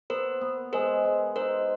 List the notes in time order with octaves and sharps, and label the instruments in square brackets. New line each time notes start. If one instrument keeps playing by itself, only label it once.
[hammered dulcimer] B3 [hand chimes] A#4 C5
[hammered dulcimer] B3
[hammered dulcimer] G#3 [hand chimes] A#4 C5
[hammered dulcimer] G#3
[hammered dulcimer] D#4 [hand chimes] A#4 C5